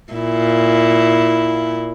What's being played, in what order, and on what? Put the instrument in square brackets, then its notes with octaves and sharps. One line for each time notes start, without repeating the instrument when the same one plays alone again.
[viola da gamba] A#2 E4